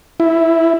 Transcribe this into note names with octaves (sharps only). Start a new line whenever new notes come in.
E4